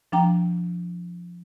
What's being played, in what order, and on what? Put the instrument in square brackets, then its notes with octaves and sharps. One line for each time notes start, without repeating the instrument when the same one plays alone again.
[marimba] F3 D4 G5 A#5